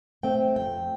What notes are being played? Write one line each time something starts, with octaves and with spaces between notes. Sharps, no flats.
A3 C4 G5
F2 G5